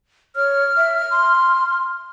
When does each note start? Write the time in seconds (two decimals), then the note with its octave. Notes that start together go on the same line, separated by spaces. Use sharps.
0.36 C#5 F6
0.77 E5
1.11 C6